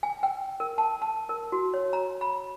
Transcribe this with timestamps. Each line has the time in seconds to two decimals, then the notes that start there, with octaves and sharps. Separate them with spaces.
0.03 G#5
0.23 G5
0.60 A#4
0.78 A5
1.02 A5
1.29 A#4
1.52 F#4
1.74 C#5
1.93 A#5
2.21 B5